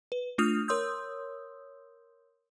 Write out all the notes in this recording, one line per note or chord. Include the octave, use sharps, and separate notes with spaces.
B4
A3 D4 F4 D#6 F6 F7
A#4 C#5 C6 D#6 E6 G6